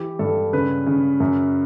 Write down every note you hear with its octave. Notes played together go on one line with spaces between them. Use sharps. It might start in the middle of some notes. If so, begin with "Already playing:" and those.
Already playing: E3 G4
G2 A4
C#3 B4
C#3
F#2